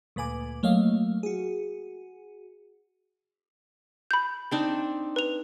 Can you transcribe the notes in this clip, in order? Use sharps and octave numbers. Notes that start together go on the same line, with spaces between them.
D2 A#2 B4 G#5 D6
F#3 A3 A#3 C#5 D#5 F5
F#4 G#4
B5 G6
C4 D4 D#4
B4 F7